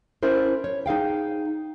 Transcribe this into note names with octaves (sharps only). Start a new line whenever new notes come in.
C#4 D4 E4 A#4 C5
C#5
D#4 G#4 F5 G5